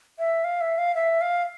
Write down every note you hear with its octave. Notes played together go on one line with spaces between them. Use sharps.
E5
F5
E5
F5
E5
F5